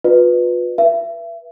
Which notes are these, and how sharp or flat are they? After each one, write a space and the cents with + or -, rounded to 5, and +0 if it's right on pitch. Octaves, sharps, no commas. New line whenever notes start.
F4 +40 B4 +0 D5 +45
B4 -25 E5 +35